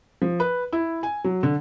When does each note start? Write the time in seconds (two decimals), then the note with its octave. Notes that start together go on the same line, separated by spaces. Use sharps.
0.22 F3
0.40 B4
0.72 E4
1.03 G#5
1.24 F#3
1.43 D3